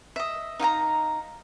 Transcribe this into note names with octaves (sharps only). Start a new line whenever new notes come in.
D#5 E5
D#4 F5 G5 A#5